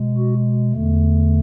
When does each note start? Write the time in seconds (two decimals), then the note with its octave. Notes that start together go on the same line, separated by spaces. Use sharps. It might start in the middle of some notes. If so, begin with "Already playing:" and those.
Already playing: B2 G#3
0.17 F#4
0.72 E2 D3 A3